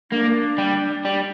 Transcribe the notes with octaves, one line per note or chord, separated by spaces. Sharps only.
A#3 D4
G3
G3